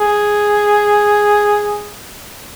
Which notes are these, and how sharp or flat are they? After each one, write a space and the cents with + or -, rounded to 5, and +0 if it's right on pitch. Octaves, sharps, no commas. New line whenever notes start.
G#4 +0